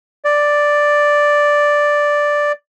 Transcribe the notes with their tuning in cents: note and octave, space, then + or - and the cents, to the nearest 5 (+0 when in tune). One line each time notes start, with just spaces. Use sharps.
D5 +0